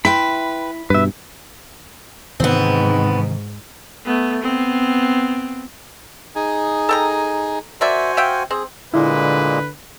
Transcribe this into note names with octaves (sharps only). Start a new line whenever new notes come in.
E4 B4 G5 B5 C6
G2 B2 B4 E5
G#2 C3 D#3 E3 B3 C4
A3 B3
B3 C4
D#4 G#4 G#5
A4 G5 A#5
A#3 F#4 C5 D5 E5 G#5
E5 F5 G5
C4 G#4
A#2 D3 G#3 A#3 E4 B4